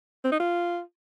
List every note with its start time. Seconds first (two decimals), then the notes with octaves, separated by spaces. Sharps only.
0.24 C4
0.32 D#4
0.40 F4